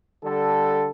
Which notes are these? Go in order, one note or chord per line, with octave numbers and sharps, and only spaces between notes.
D3 G3 A4